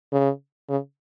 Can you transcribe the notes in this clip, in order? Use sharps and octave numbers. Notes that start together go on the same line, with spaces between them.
C#3
C#3